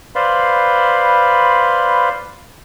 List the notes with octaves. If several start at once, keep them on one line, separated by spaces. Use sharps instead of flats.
B4 C5 D5 F5 B5 C6